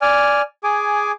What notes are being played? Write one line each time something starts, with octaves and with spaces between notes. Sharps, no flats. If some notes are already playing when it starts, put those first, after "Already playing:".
D5 G#5 F6
G#4 G#5 D6